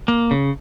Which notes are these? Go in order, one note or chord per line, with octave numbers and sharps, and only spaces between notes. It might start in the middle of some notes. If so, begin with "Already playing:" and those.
A#3
C#3